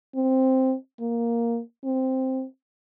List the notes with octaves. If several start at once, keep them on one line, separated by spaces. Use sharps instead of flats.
C4
A#3
C4